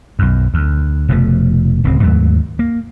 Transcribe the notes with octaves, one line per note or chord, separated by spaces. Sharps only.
B1 F#2
D2
F1 B2 F3 A3
D1 C#2 G#3 C4
D#2 G#2 F#3 A3
A#3